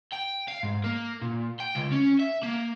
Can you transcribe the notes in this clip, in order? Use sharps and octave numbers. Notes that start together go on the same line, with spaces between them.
G5
F5
G#2
A#3
A#2
G5
C#2
C#4
E5
A#3